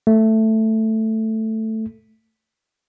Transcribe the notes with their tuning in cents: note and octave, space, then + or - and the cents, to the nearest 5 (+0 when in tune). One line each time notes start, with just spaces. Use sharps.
A3 +5